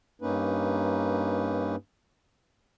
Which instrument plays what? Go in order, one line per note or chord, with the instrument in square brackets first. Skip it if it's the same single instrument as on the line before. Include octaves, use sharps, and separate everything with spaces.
[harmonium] G2 A#3 C#4 D#4 B4